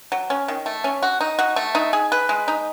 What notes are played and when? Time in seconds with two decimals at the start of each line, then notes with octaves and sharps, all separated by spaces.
0.12 F#3
0.30 C#4
0.48 D#3
0.66 A3
0.84 C#4
1.03 F#4
1.21 D#4
1.39 F#4
1.56 A3
1.75 D#4
1.93 G#4
2.12 B4
2.29 G#3
2.48 D#4